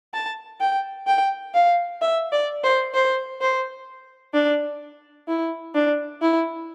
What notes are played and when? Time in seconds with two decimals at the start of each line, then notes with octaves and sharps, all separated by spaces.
0.14 A5
0.60 G5
1.07 G5
1.54 F5
2.02 E5
2.32 D5
2.64 C5
2.94 C5
3.41 C5
4.34 D4
5.28 E4
5.75 D4
6.22 E4